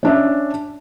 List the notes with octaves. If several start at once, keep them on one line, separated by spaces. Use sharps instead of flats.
C#4 D4 E5